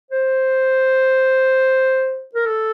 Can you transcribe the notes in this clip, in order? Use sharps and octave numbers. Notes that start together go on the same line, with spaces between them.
C5
A#4
A4